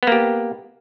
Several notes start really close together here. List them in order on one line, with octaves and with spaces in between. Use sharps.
B3 A#3 G4